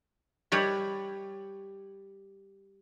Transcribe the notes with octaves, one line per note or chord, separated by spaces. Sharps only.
G3 C#5 B5